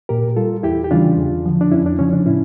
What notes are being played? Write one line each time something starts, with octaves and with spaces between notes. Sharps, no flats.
A#2 G4 A#4
G3 F4 A4
E2 E4 G4
G4
C#3 E3 G3 D4 F4
E2
D3 F3
D4
F2 C#4 E4
D4
C#3 F3 C#4
D4
A2 C#4 E4